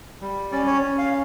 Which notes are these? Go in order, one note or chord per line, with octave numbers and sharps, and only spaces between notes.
G3
C#4 D5
C#5
C#4
F5